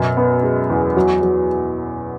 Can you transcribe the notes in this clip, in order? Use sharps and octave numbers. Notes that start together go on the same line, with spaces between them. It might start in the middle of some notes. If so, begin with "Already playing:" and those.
Already playing: F#2 B2
B3
G#3
E2
F#3
F#3